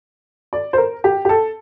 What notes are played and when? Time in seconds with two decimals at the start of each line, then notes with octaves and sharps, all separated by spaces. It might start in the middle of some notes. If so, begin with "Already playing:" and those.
0.53 D5
0.73 C5
0.78 A#4
1.04 G4
1.25 G4
1.29 A4